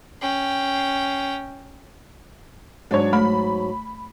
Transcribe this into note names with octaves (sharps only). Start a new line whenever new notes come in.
C#4 G5
G#2 F#3 D4 C#5
A3 B5